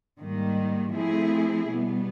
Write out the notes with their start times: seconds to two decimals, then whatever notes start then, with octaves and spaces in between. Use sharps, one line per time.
0.19 G#2 D#3 G3 A#3
0.93 F3 A3 C4 E4 G#4
1.68 B2 G3 B3